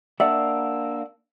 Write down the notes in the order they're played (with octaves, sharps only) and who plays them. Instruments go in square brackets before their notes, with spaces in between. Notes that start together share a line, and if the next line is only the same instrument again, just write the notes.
[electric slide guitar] A#3 D4 [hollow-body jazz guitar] D5 E5 F#5 [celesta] E6